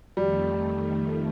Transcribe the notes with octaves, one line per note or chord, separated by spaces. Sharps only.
F2 D#3 G3 A3